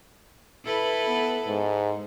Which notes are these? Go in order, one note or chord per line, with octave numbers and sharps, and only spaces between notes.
E4 A4 B4
B3
G#2